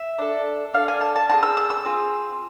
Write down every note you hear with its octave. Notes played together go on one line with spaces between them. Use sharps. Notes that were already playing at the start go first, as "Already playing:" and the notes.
Already playing: E5
D4 A4
D4 A4 F5
G#5
A5
A5
C4 F4 G#4 A5
E6
E6
E6
C4 F4 G#4